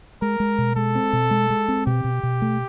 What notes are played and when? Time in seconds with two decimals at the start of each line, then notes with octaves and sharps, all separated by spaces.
0.22 G#3 A#4
0.40 G#3
0.58 B2
0.76 G#3 A4
0.95 C4
1.13 B2
1.31 G#3
1.50 G#3
1.68 C4
1.86 B2 G4
2.04 B2
2.23 B2
2.42 A3